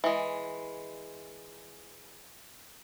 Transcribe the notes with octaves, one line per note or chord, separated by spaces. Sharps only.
E3 G#3